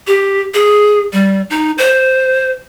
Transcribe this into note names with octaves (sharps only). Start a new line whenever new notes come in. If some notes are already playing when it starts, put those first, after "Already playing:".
G4
G#4
G3
D#4
C5